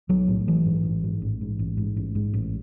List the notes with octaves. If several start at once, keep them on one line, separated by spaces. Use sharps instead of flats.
B1 F#3
A2
A1 E3
G#2
A1
G#2
A1
G#2
A1
G#2
A1
G#2
A1